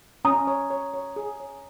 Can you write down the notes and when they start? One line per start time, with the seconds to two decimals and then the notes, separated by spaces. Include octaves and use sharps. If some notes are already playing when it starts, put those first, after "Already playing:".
0.25 C#4 A#5 D#6
0.47 C#5
0.70 C#5
0.94 C#5
1.16 G#4
1.40 C#5